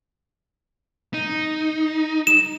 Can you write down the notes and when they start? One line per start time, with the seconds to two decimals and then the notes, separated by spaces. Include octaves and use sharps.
1.14 D#4
2.27 E7